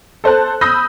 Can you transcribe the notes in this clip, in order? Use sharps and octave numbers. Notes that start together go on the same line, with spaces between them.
A4 C5 A5 F#6
B5 D#6 E6 G6 A#6